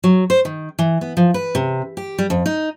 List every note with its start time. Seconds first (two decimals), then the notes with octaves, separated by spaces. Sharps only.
0.04 F#3
0.30 C5
0.45 D#3
0.79 E3
1.01 B3
1.17 F3
1.34 B4
1.55 C3
1.97 G4
2.18 G3
2.30 F2
2.46 D#4